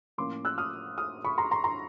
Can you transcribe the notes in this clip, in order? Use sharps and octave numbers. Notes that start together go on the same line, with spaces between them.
A2 F3 A#3 C#4 F4 C6 D6
E6 F#6
D#6 F6
D#6 F6
B5 C#6
A#5 C6
A#5 C6
A#5 C6